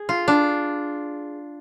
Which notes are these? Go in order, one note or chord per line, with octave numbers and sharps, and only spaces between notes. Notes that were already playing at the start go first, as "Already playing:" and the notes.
Already playing: G#4
F4
D4